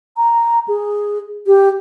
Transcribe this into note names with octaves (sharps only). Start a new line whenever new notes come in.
A#5
G#4
G4